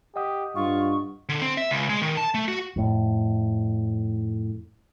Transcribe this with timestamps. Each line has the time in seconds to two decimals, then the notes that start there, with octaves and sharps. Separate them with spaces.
0.16 G4 D#5 F#5 D#6
0.55 G2 F4 C#6
1.29 D3
1.41 C4
1.58 E5
1.71 C#2
1.89 G#3
2.02 D#3
2.17 A5
2.34 A3
2.48 F#4
2.76 F2 A2